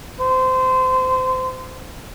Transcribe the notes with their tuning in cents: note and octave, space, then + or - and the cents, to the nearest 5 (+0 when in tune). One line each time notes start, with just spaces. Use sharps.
C5 -25